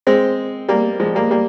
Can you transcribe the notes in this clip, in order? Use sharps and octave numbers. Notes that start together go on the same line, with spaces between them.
G#3 C4
G3 A#3
F3 G#3
G3 A#3
G3 A#3